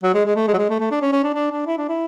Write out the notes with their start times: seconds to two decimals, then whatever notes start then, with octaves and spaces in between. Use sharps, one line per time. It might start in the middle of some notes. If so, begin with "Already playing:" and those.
0.03 F#3
0.14 G#3
0.25 G#3
0.35 A3
0.48 G#3
0.53 F#3
0.58 G#3
0.69 A3
0.80 A3
0.91 D4
1.01 C#4
1.12 C#4
1.23 D4
1.34 D4
1.51 D4
1.67 E4
1.77 D4
1.89 E4